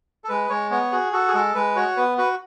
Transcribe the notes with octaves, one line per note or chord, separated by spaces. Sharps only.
A4
G#3 B4
G#3 C#5
B3 C#5
F#4 G#4
F#4 A4
G#4
G#3 A4
G#3 B4
F#4 C#5
B3 B4
F#4 B4